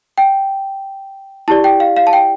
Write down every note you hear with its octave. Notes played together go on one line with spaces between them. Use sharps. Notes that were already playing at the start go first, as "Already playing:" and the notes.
G5
E4 G4 D5 A5
G5
F5
F5
A5
G5